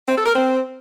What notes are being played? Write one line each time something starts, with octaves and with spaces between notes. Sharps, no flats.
C4
A4
A#4
C4